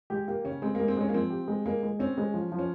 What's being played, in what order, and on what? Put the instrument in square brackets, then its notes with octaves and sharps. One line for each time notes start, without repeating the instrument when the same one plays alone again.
[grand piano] G#3 [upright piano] G4
[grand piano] A#3 [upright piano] G4
[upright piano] C#3 [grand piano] C#4
[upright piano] G#3 [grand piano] C4
[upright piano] G#3 [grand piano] A#3
[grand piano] C4
[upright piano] G#3 [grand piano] C#4
[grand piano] A#3
[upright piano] F3 [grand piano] C4
[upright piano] G4
G#3
[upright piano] G#3 [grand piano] A#3
[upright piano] G#3
[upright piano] C4 [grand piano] C#4
[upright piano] G#3
F3
F3
[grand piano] C#4